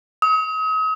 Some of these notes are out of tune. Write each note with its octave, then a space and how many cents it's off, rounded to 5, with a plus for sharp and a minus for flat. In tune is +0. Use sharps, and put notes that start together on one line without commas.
D#6 +40